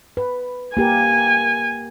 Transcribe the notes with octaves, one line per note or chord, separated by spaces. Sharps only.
B4
A#3 G4 A#4 G#5